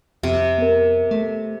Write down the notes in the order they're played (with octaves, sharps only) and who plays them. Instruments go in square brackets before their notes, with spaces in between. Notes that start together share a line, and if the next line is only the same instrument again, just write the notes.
[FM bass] F2 [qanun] C3
[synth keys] B3 A#4
[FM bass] A3